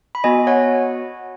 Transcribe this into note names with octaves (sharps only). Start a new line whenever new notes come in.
B5
B3 F#4 D#5 G#5
C#5 F#5